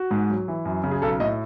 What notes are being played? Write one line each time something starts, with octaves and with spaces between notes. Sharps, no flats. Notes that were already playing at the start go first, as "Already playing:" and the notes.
Already playing: F#4
G#2
F#3
E3
F#2
C#3
G#4
B1 A4
A2 D#5